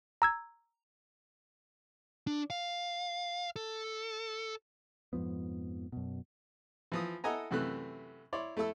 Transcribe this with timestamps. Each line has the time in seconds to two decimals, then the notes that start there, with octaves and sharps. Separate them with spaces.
0.22 A#5 E6 G#6
2.27 D4
2.50 F5
3.56 A4
5.13 F2 G#2 F3 B3
5.92 F#2 B2
6.92 E3 F3 D#6
7.24 E4 A4 D#5 F#5 G#5 A#5
7.51 F#2 C3 E3 A3 F#6
8.33 E4 C#5 D5 C6
8.57 A3 E4 A4 E6